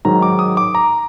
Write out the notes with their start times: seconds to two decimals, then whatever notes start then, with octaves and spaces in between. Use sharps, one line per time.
0.05 G#2 D#3 F#3 A#5
0.22 D6
0.39 D#6
0.57 D6
0.75 A#5